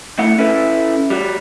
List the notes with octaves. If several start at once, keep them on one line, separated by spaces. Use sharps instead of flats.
A3 E4 F#5
C#4 E4 A4 B4
G3 F#4